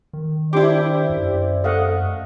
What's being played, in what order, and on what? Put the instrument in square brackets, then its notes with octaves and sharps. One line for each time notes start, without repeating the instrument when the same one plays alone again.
[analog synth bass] D#3
[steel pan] D4 C6 D6 [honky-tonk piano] E4 G4 [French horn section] C5 D5
[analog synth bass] F#2
[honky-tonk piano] A3 [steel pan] D#5 F5 F#5